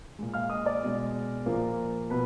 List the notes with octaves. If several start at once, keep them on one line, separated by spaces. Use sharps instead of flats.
A#2 G#3
F5 F6
D#5 D#6
D5 D6
B2 G#3
A#2 F3 A#3
B2 B4 B5